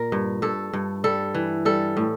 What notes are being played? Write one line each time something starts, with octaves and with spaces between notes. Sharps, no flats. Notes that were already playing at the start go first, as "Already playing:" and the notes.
Already playing: A#2 A#4
G2
G2 A4
G2
G3 A4
E3
G3 A4
A2